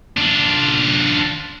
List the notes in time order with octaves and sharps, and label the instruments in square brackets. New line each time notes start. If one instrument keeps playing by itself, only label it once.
[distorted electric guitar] D4 F4